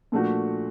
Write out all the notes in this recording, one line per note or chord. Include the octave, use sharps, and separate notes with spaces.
A#2 F3 A3 D4 F#4